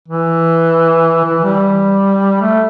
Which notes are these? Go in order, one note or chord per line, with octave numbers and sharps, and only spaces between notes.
E3
E3
G3
A3